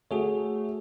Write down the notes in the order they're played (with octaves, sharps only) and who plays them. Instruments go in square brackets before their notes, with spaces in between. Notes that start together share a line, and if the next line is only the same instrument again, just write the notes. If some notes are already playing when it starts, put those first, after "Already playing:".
[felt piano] A3 [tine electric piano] F#4 G#4 C#5